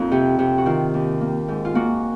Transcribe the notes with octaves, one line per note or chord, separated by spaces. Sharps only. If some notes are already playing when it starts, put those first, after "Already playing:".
Already playing: F2 A#3 D#4 F4
C3
C3
F#4
D#3 F4
D#2
A#3
G#2
F4
A#3 F#4